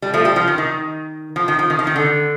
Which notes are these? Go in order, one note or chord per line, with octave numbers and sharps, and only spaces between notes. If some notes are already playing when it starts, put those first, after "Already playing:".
G3
F3 A3
G3
F3
D#3
D#3
F3
D#3
F3
D#3
F3
D#3
D3